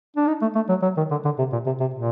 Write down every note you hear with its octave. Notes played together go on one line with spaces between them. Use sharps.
D4
D#4
A3
A3
F#3
F#3
D#3
D3
D3
C3
A#2
C3
C3
A#2